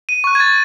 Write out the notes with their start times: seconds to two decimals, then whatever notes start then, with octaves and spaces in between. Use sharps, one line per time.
0.09 D#7
0.24 C#6 F#6
0.35 G#6
0.40 A6